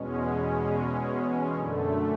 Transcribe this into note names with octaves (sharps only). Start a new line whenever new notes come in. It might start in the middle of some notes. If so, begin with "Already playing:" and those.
Already playing: E2 B2 G#3 C#4
F#2 D3 A3